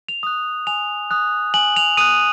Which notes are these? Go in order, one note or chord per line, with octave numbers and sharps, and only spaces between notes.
F7
D#6 F#6
G#5 F7
D#6 F#6
G#5 F#7
F7
D#6 F#6 D#7